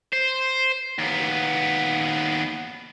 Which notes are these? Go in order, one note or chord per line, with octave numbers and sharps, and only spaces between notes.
C5
D#2 B3